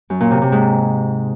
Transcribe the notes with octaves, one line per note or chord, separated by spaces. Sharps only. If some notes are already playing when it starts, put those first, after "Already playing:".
F#2
A#2
C3
C3
G#2